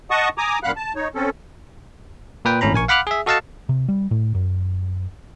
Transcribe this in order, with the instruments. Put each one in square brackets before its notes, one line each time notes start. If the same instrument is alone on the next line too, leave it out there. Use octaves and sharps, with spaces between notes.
[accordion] D#5 F#5 A5 C#6 D#6
G#5 A#5 D6 D#6
F#2 A#2 F5 F#5 B5 F#6
A5
D#4 C#5
C4 C#4 A4
[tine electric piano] A#2 B4 G5
G#1 A2 C#4 A#5 B5
A#1 A#4 G#5 C#6
F5 F#5 B5 D6 F6 F#6
G#4 E5
F#4 A4 D#5 F5 F#5 A5
[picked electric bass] C3
G3
A2
F#2